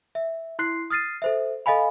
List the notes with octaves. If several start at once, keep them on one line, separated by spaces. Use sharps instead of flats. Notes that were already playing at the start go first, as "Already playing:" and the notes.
E5
E4 C6 F#6 C7
D#6 F6 A6 C7 D#7
A4 C5 E5
A4 D#5 F5 G#5 B5